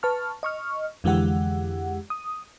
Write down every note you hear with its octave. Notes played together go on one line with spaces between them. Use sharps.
B4 A5 C#6 F6
D#5 C#6 F6
F2 D3 E3 G#3 G4 F#5
D#6